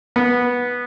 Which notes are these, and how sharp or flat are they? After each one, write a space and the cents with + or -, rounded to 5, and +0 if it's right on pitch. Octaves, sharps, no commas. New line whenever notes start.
B3 -10